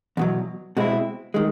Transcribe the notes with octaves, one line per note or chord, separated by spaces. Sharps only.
E2 B2 F#3
B2 G#3 C4 E4
D#3 G#3